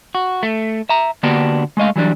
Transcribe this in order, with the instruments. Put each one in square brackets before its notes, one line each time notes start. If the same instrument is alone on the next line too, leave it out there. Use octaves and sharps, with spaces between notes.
[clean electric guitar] F#4
A3
E5 A#5
D3 A#3 B3 D4 F#4 G4
G#3 A3 D#5 F5
E3 F#3 G3 D4